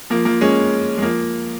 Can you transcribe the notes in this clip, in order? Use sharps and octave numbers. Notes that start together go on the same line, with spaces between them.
F3 A#3
F3 A#3
G#3 C#4
G#3
F3 A#3